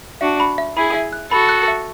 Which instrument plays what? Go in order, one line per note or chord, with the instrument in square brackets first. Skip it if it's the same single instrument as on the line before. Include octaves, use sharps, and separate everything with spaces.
[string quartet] D4 F#4 [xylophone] E5
[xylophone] B5
E5
[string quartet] E4 G#4 [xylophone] B5
[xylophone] E5
F#6
[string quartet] F#4 A4 [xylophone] B5
[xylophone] F#6
E5